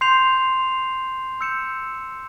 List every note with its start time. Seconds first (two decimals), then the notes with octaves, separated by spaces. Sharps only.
0.01 C6 G6 C7 F7
1.41 E6 G6 C#7 E7